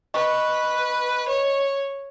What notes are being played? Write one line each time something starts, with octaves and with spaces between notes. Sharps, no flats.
B4 D#5 C#6
C#5